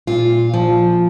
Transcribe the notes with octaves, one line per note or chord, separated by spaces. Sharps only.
A#2 F4
F3